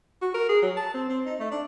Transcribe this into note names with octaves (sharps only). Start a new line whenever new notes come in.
F#4
A#4
G#4
F#3
A5
C4
C4
D#4
A3
D4